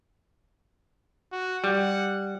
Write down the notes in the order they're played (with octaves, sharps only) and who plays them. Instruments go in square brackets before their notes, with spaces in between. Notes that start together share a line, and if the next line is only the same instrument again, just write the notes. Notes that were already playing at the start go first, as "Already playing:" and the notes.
[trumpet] F#4
[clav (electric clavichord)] G3 [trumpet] F#5